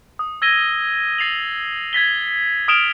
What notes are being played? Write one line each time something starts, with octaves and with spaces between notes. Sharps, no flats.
D#6
E6 G#6 A#6 D#7 G7
A6 C7 F7 F#7
G#6 A6 B6 G7
D#6 F6 D7 E7 F7 G7